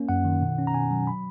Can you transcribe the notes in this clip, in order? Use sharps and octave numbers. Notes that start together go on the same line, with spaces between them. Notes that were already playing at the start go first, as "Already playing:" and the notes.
Already playing: A#3 C#4
F#2 F#5
D#3
B2
C#4
A#5
B2 G#5
F#3
B5